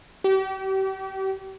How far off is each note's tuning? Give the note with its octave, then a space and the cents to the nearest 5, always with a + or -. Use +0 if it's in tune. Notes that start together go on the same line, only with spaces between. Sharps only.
G4 -35